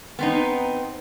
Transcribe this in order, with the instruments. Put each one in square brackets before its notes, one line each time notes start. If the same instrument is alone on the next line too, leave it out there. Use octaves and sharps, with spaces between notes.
[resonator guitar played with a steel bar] B3 C4 D#4